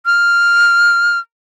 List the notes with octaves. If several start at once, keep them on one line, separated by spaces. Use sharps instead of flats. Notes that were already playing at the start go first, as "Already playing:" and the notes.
F6